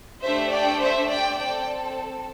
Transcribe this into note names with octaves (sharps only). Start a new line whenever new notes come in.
A3 D4 G4 C5 E5
D5 G5
C5 E5
D5 G5
C4 A4 D5 G5